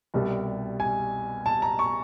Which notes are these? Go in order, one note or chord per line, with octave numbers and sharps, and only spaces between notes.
C2 B2 G3
G#5
A5
A#5
C#6